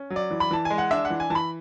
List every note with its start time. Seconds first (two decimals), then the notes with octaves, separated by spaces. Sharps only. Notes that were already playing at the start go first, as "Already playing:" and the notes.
Already playing: C#4
0.10 F#3
0.16 D5
0.31 E3
0.40 B5
0.51 E3 A5
0.65 G#5
0.70 G#3
0.78 F#5
0.91 D4 E5
1.05 F#5
1.10 E3
1.20 G#5
1.30 E3 A5
1.35 B5